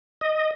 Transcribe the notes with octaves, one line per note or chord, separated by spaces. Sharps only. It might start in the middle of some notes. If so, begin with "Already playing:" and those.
D#5